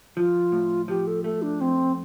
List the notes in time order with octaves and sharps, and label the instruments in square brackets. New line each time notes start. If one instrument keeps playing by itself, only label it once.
[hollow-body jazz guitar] F3 [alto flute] F4
[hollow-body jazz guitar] A2
[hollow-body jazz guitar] F3 [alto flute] G4
[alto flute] A4
[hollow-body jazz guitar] A3 [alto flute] A4
[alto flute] D4
[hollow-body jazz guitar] F2 [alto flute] C4